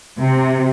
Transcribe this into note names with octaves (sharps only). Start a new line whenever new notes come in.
C3